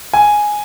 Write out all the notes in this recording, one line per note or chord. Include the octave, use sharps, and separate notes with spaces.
G#5